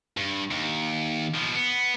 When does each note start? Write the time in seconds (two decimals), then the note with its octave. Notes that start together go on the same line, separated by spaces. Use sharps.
0.17 G2
0.51 D#2
1.34 B2 F3
1.55 B3